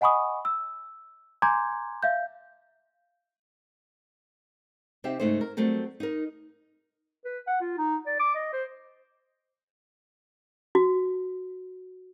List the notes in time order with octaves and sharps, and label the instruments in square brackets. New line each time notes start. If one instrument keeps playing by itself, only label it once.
[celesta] D#5 F#5 G#5 B5 C#6 D#6
E6
G#5 A#5 C6 D6 G6 G#6
E5 F5 G6
[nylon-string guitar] C3 C4 D#4 G4 E5
G#2 C#3 A3 D#4 C5
A#4
F#3 G3 A3 C4 A#4
D#4 A#4
[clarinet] B4
F#5
F4
D#4
D5
D6
D#5
C5
[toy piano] F#4